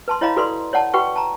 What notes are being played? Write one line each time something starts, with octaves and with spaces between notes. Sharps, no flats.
B4 A5 C6
E4 C#5 D#5 F5 A#5 B5
F#4 A4 B4 D5 C6
C#5 D5 F#5 A5
F#4 B4 F#5 G5 C#6
A5 A#5